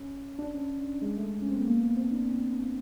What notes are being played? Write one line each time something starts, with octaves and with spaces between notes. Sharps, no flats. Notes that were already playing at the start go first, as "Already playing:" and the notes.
Already playing: C#4
D4
C#4
G#3
A3
C#4
C4
B3
A#3
B3
C4
D4